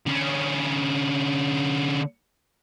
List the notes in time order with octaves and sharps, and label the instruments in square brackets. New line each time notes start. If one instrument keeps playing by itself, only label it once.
[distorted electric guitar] D3 C#4